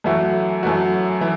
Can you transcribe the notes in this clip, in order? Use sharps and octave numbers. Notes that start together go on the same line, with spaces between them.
F#2 E3 A3 F#4
F#2 E3 A3 F#4
E3